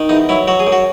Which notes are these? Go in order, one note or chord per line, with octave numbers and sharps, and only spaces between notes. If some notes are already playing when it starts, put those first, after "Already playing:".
Already playing: D#3
E2 D#4
F#3 E4
F#3 F#4
G#4
F#2
F#4